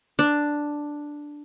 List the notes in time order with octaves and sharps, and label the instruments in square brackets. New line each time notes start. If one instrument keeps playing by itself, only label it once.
[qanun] D4